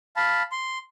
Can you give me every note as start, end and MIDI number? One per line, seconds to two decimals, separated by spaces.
0.16 0.42 77
0.16 0.42 81
0.16 0.42 83
0.52 0.78 84